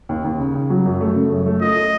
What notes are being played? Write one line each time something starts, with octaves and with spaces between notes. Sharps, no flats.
D#2
D#2
C#3
C#3
F#3
F#2
A3
C#3
F#2
A3
F4 D#5
A3